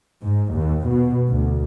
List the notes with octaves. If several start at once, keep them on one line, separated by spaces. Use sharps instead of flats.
G#2
D#2
B2
D2